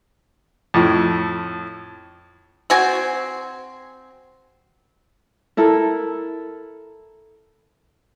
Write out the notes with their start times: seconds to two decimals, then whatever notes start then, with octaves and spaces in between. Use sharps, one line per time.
0.74 F2 A2
2.70 C4 F#4 G#5
5.57 E4 A4 A#4